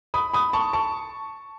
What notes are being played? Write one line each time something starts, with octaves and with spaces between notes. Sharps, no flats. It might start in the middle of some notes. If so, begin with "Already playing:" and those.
B5 D#6
B5 D#6
A5 C#6
A5 C#6